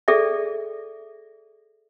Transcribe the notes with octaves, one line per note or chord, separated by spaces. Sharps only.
G#4 A4 D5 E5